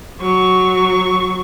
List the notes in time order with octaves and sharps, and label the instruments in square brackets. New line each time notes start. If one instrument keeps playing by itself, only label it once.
[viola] F#3 C#6